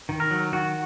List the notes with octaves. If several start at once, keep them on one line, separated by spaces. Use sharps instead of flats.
D#3
A#4
F#3
D#3 F#4